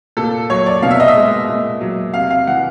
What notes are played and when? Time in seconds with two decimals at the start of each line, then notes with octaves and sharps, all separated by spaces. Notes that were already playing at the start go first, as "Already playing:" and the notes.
0.17 A#2 A4
0.50 F#3 C#5
0.66 D5
0.82 B2 F5
0.91 E5
1.00 D#5
1.08 E5
1.16 G#3
1.49 A#2
1.81 F#3
2.14 C3 F5
2.31 F5
2.47 E3 F#5